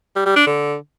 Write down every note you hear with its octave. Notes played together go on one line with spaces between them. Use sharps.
G3
G3
D4
D3